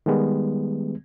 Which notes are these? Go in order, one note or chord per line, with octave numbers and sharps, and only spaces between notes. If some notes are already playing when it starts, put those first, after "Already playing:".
D#3 G3 G#3 B3